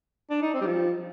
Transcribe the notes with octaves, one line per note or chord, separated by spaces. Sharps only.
D4
D#4
C4
G3
F3